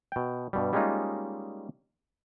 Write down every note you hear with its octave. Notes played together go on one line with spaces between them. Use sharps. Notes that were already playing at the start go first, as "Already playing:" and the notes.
B2 G5
G2 B2 G3
G3 G#3 A#3 C#4 D#4 F4